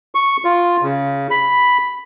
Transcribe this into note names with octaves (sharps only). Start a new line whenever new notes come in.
C#6
F4
C#3
B5